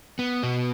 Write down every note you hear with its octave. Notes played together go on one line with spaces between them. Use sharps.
B3
B2